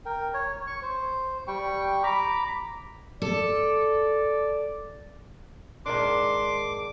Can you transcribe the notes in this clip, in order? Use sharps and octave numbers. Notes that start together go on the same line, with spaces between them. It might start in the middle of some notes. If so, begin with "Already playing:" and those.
A#4 G5
C#5
C#6
C5
G3 G5 C#6
A#5 B5 D6
A4 D5
G#2 D#3 D4 C6 D6